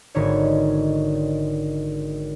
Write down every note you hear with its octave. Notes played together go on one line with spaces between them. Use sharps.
G#1 G#2 D3 C#5